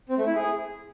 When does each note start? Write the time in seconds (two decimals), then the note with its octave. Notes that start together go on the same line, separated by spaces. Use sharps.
0.09 C4
0.18 A3
0.27 E4
0.35 G#4